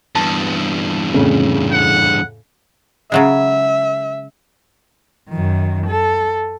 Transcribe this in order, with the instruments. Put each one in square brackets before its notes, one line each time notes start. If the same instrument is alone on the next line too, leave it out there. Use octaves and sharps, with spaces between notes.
[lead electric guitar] E2 G2 [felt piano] A5
[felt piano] F2 A2 C#3
[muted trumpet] F#5
[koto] C#3 F#3 G#3 [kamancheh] E5
[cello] F#2 D#3
A4